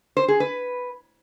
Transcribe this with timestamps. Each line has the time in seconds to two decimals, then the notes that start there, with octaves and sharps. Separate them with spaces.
0.17 C5
0.28 G#4
0.40 B4